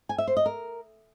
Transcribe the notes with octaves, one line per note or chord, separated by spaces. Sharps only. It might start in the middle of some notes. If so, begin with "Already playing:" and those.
G#5
E5
C5
D#5
A#4